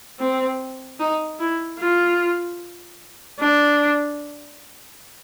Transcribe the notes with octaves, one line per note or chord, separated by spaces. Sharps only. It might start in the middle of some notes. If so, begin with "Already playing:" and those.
C4
D#4
E4
F4
D4